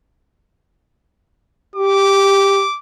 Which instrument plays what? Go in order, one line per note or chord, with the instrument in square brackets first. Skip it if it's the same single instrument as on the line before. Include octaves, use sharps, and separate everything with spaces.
[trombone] G4 [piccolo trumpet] D6